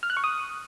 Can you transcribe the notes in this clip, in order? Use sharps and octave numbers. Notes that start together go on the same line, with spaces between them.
F6
F#6
C#6
D#6